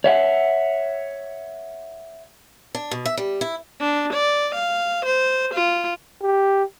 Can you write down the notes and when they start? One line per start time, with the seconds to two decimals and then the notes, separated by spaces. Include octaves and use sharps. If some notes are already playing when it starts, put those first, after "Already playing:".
0.04 C#5 E5 F#5
2.75 D4
2.91 B2
3.05 E5
3.17 G3
3.41 E4
3.80 D4
4.13 D5
4.55 F5
5.05 C5
5.54 F4
6.22 G4